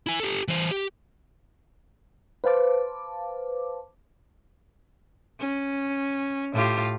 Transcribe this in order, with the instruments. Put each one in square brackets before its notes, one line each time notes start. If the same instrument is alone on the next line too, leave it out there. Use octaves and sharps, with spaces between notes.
[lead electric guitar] E4 G#5
G4 A4
E3 C5
G4
[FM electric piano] B4 C5 F5 A5 D6
[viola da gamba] C#4
A2 F4 G4